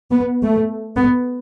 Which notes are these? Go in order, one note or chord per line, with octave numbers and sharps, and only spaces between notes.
B3
A3
B3